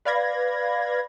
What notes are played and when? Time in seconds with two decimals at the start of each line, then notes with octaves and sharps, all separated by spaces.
0.05 B4 D5 F5 B5 G#6 A#6